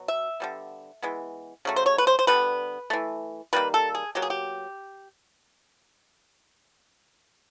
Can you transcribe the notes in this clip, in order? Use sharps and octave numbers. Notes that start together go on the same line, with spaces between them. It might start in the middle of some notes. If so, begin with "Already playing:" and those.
Already playing: B2 F#3
E5
D3 G3 B3
E3 G#3 B3
C#3 F#3 A3
C5
C#5
B4
C5
C5
D3 G3 B3 B4
E3 A3
D#3 G3 A#3 B4
A4
G#4
B2 F#3 A#3 G4
G#4
G4